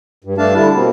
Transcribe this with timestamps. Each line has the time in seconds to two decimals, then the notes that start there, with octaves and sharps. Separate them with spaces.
0.24 G2
0.38 G2 A3 D4 F5 A5
0.55 D3 G3 E4 A5
0.75 B2 A#3 C4